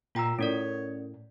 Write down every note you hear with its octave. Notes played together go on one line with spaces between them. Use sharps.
A#2 F4 G5 A#5 E6
A2 C#4 A#4 C#5 D5